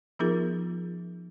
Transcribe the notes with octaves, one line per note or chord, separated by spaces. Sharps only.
F3 B3 D#4 F4 G#4 A#4